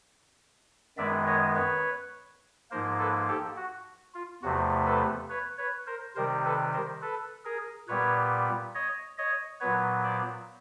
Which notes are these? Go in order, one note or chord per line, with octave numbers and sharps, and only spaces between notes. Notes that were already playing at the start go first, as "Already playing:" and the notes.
F#2 D#3 G#3 B3 D5 E5
C#5 D#5
B4 C#5
G#2 F3 A#3 A#4 C5
A4 B4
G4 A4
F#4
F4
E2 C3 F3 A3 F#4
A4 B4
B4 C#5
B4 C#5
A#4 C5
C3 D#3 G3 A#4 C5
A4 B4
A#4 C5
A4 B4
G#4 A#4
A#2 G3 B3 B4 C#5
C#5 D#5
C#5 D#5
A#2 F#3 B3 B4 C#5
C5 D5